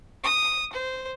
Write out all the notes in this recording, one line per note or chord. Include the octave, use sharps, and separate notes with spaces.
D#6
C5